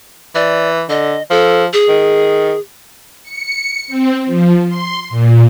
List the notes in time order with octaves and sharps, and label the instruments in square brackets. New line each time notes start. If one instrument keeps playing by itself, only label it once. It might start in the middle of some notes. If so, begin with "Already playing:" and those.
[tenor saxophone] E3 [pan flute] D5
[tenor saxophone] D3 [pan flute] D#5
[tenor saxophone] F3 [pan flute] A4
[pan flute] G#4
[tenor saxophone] D#3
[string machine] C#7
C4
F3
C6
A#2